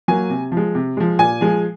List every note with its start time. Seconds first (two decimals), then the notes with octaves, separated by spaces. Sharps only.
0.08 F#3 A#3 G#5
0.30 C3
0.52 F3
0.57 G#3
0.75 C3
0.97 F3 G#3
1.19 A#2 G#5
1.41 F3 G#3